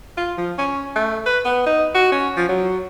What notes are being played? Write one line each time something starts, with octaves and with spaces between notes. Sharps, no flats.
F4
F3
C#4
A3
B4
B3
D#4
F#4
C#4
F3
F#3